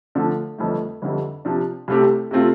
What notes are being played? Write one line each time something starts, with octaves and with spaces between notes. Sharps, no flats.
D3 F3 A3 D4
G1 F2 F3 A3
G1 F2 D3 G3
C3 F3 D4
C2 C3 A3 C4 G4
C3 A3 C4 F4